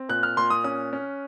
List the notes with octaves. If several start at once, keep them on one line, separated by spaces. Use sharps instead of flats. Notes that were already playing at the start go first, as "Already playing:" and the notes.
Already playing: C4
A#2 F#6
F6
A#2 C6
D#6
C#4 D#6
C#4